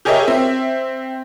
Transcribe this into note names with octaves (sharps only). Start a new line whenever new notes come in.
G4 G#4 A#4 C#5 D#5 E5
C4 E5